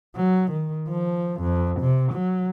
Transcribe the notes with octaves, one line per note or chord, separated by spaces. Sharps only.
F#3
D#3
F3
F2
C3
F#3